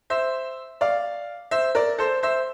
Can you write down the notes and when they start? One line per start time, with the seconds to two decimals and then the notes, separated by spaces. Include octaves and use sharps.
0.10 C5 E5
0.81 D5 F5
1.51 C5 E5
1.75 A#4 D5
1.98 A4 C5
2.23 C5 E5